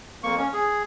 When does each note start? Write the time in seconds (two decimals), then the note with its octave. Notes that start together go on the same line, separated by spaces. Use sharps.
0.24 F2 A#3 C#6
0.38 C#4
0.53 G#4